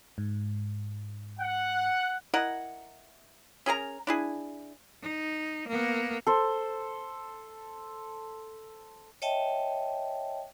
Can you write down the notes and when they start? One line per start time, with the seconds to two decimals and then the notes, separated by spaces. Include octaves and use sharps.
0.18 G#2
1.39 F#5
2.34 E4 A#4 D#5 F#5
3.66 C#4 G#4 A#4 A#5
4.07 D4 E4 G#4
5.03 D#4
5.68 A#3 B3
6.27 A4 C5
9.22 C#5 D#5 E5 G5 A5